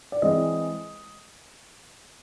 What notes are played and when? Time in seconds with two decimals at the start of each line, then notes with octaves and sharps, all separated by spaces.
0.12 D5
0.22 E3 G#3 C4 D#5